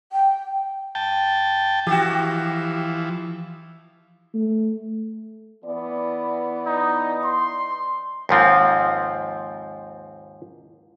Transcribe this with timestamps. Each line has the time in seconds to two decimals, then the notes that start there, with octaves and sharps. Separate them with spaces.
0.12 G5
0.95 G5 A5
1.87 E3 F3 F#4 G4
4.34 A3
5.65 E3 B3 D5
6.66 D#4
7.24 C6
8.29 D#2 G#2 F3 C4